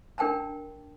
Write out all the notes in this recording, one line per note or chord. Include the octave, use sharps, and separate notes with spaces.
D4 A#4 G5 A5 A#5